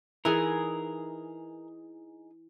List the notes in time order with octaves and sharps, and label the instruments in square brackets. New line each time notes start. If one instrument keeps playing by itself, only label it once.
[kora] E3 E4 [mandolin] D#4 G#4 [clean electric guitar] A#4